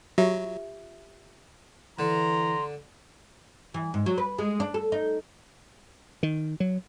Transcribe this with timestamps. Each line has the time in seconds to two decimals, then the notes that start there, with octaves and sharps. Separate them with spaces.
0.18 F#3 F4 G4 E5
1.99 D3 E3 A#5 C6
3.74 E3
3.94 G#2
4.06 F#3
4.18 B4
4.38 G#3
4.60 D4
4.74 A4
4.92 D#4
6.23 D#3
6.60 F#3